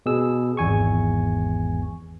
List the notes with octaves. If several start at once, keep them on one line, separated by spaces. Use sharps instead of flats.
B2 G#4 E6
G#1 E2 G#5 C#6